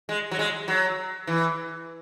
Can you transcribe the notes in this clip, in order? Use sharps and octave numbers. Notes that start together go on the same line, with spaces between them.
G#3
F#3
G#3
F#3
E3